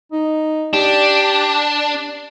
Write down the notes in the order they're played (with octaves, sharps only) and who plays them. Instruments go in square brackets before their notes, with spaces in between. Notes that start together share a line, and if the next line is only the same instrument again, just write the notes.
[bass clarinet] D#4
[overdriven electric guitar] D4 [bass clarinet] G4